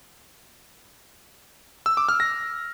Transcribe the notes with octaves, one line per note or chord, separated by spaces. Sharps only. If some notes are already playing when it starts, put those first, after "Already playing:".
E6
D6
F6
A#6